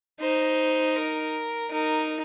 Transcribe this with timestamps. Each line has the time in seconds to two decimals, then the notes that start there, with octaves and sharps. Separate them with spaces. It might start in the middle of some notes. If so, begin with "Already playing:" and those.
0.21 D#4 C5
0.96 A#4
1.71 D#4 A#4